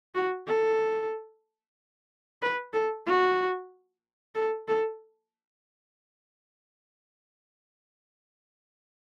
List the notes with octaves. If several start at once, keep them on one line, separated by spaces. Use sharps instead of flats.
F#4
A4
B4
A4
F#4
A4
A4